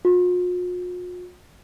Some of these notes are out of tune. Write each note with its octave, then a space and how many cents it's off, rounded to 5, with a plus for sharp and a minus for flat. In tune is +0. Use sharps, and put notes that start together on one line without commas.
F4 +45